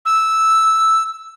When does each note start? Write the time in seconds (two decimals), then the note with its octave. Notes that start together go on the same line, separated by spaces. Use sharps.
0.06 E6